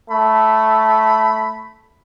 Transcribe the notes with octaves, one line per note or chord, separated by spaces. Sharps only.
A3 B5